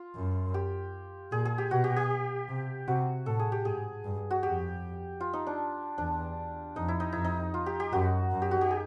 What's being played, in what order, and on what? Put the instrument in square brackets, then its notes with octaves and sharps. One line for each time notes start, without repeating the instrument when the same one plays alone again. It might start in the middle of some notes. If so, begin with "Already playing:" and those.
Already playing: [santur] F4
[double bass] F#2
[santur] G4
[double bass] A#2 [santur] G#4
[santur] G#4
G4
[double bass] B2 [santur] F#4
[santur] G4
G4
[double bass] C3
[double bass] C3 [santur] F#4
[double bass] A2 [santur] A4
[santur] G#4
G4
[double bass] G#2 [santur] G#4
[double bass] G2
[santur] F#4
[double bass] F2 [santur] G4
[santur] F4
D#4
D4
[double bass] E2 [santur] D4
[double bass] F2 [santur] D#4
[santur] E4
D#4
[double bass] F2 [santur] E4
[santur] D#4
F4
G4
G4
[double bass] F#2 [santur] F#4
[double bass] F#2
[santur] G4
F#4
G4
G#4